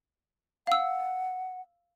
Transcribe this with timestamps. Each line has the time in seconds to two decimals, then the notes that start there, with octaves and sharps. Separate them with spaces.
0.67 F5 F#5 E6